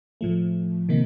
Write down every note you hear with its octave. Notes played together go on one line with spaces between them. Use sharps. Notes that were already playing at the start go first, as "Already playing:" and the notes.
A2 F3 A3
C3 D#3 A#3 D#4